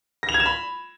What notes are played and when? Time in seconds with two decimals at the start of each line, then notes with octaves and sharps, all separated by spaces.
0.23 A#6
0.29 F7
0.34 G#6
0.40 E7
0.46 B5